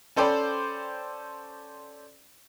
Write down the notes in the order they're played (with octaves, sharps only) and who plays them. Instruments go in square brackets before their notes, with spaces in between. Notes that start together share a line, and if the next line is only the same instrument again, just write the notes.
[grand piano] C#4 A4 C5 D5 G5 B5